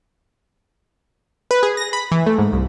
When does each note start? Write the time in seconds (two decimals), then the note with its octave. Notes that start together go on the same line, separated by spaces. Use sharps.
1.51 B4
1.63 G#4
1.77 A#6
1.93 B5
2.12 E3
2.26 A3
2.39 G#2
2.52 C2